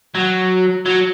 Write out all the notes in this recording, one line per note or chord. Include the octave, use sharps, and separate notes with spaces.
F#3
F#3